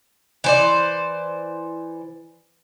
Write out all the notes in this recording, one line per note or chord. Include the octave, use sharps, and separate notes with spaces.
E3 C5 D5